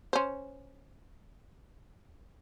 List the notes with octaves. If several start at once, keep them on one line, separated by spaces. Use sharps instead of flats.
C#4 C5